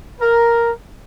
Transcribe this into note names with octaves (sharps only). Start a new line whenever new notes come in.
A#4